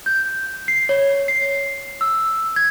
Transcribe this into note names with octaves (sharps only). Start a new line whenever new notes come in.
G6
C7
C#5
C7
E6
G#6